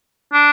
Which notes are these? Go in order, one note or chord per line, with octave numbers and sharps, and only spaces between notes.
D4